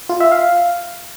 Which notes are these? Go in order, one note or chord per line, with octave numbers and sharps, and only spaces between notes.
F4
E5
F5